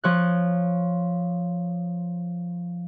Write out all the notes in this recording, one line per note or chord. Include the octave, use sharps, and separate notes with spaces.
F3 C#5 F#6